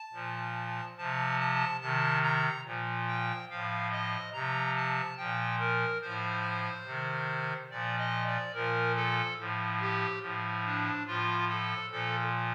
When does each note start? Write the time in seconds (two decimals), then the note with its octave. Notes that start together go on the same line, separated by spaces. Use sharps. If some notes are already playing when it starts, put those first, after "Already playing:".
Already playing: A5
0.13 A#2 F3
0.97 C3 F3 A5
1.39 A5
1.81 C3 D#3 A5
2.23 A#5
2.65 A#2 F3
3.08 G5
3.50 A2 F3 F5
3.91 D#5
4.33 C3 F3 A#5
4.76 A5
5.18 A#2 F3 G5
5.60 A#4
6.01 A2 F3 C5
6.86 C3 D#3
7.70 A#2 F3 D5
7.98 D#5
8.26 D5
8.54 A#2 F3 A#4
8.96 A4
9.39 A2 F3
9.81 G4
10.22 A2 F3
10.65 D4
11.07 A2 F3 F4
11.48 A4
11.91 A#2 F3 A4